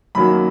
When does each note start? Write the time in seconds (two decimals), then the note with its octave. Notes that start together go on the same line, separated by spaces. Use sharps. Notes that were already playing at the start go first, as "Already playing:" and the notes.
0.15 F#2 D#3 F#3 A#3 B5